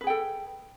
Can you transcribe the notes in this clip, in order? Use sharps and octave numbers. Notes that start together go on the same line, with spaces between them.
G#4 A4 B4 G5